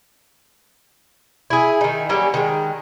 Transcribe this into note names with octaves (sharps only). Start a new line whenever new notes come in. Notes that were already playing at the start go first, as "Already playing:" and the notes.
E4 G#4
D#3 D#4
F#3 G3 A#3 C#4
D#3 G#3